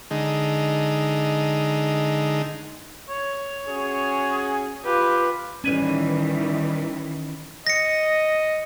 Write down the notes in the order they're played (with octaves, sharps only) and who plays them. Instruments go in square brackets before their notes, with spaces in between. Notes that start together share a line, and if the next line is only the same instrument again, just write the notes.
[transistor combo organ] D3 G#3 D#4
[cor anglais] C#5
[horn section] C#4 F#4 G#4
[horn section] F4 [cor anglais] G4 [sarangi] B4
[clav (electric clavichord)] A1 B4 G#5 [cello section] D#3 E3 [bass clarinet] G3 [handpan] C#4
[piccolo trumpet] D#5 [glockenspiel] A#6 C#7